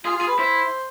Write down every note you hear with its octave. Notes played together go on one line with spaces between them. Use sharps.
F4 G#4
F4
G#4
B4
E4 C5